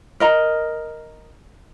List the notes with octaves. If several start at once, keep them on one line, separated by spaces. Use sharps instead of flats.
A#4 D#5 A#5